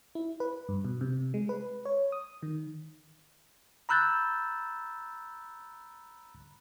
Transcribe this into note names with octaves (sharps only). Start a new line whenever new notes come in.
E4
B4
G2
B2
C3
G#3
B4
C#5
D#6
D#3
A#5 B5 E6 F#6 G6 A6